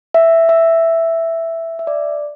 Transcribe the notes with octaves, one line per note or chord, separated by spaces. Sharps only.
E5
E5
E5
D5